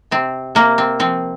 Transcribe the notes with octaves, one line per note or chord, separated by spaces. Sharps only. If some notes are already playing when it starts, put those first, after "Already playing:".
C3 C4
C3 A#3
C4
F3 C4